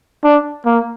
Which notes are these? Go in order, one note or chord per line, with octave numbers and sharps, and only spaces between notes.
D4
A#3